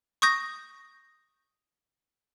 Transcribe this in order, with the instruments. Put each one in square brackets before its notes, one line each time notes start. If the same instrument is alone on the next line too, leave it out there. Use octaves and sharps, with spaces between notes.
[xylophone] C#6 D#6 G6 A#6